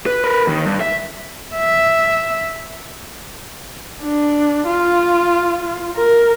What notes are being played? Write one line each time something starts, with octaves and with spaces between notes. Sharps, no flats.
B4
A#4 B4
D#2 D#3
G2
E5
E5
D4
F4
A#4